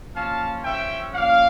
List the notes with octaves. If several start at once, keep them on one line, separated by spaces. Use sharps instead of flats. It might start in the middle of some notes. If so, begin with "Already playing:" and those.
F3 A#3 C#4 F4 F5 A5
C#3 F3 C#4 E5 G5
F3 A#3 C#4 D5 F5